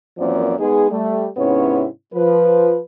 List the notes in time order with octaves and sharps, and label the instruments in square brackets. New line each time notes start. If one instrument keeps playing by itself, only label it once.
[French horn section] F#2 E3 F3 A#3 C4 D5
G#3 B3 D#4 G#4
G3 A3
G#2 C3 B3 C#4 E4 C#5
F3 B4